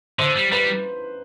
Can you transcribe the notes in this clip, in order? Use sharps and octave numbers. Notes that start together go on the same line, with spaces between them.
D3 C5 C6
G3
G3 B4 B5